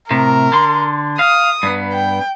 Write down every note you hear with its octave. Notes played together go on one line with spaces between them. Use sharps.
A2 C3 A#4
D3 C6
F5 D#6
G2 B3
G5